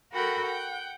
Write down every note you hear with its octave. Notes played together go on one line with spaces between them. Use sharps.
F#4 A4 A#4 F#5 G5 B5
F#5 G5